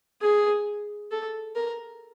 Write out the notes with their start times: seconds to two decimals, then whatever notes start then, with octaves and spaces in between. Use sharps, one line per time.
0.22 G#4
1.11 A4
1.55 A#4